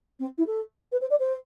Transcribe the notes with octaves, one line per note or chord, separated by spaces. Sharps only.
C4
E4
A4
B4
C5
D5
C5